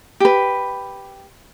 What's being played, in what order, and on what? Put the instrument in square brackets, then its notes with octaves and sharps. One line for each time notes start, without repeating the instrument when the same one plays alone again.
[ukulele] G4 B4